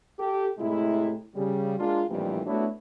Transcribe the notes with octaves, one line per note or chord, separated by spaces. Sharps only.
G4 A4
A2 C3 G#3 E4
C#3 G3
G#3 A#3 D4 F4
A#1 F2 A2 D#3 E3 G3
A3 B3 D4 E4 F#4 C#5